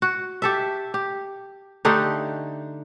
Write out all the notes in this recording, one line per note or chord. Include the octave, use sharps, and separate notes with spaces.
F#4
G4 A4 E5
G4
D3 A3 D#4 G4